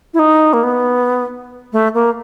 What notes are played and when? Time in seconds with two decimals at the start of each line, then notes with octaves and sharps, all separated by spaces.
0.14 E4
0.19 D#4
0.53 A#3
0.63 B3
1.73 A3
1.94 A#3